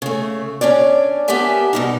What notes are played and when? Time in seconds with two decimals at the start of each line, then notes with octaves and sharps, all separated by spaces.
0.02 C#3 A3
0.61 C#4 D4 C#5 D5
1.28 B3 G4 A4 A#4 E5 G#5
1.73 B2 G3 D#4